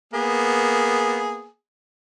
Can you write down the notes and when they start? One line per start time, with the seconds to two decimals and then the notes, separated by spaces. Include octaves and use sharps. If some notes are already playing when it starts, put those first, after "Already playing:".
0.14 A#3 B3 G#4